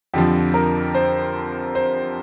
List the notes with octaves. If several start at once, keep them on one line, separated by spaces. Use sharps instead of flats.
F2 D3 F3 G4
A#4
C5
C5